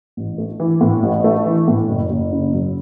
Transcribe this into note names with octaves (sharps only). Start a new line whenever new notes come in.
A1
A3
E3
A2
A1
A3
E3
A2
F#1
F#1
C#3
F#2